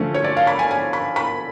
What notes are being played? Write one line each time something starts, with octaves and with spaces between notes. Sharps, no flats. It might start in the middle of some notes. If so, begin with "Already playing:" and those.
Already playing: D3 F3 A3 C#4
C#5
D5
F5
B5
G#5
G#5
B5
B5